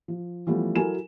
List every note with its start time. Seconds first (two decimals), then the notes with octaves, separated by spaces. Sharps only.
0.08 F3
0.47 E3 F3 G3 A3 B3
0.75 F#3 E4 A4 A#4 G#5 E7